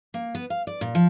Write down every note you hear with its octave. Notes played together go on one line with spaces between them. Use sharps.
A#3
B3
F5
D5
A#2
F3